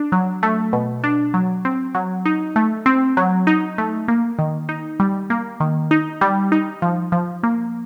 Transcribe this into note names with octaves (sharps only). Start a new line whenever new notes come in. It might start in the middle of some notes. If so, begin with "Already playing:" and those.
Already playing: D4
F#3
A3
B2
D4
F#3
C4
F#3
D#4
A3
C4
F#3
D#4
A3
A#3
D#3
D#4
G3
A#3
D#3
D#4
G3
D#4
F3
F3
A#3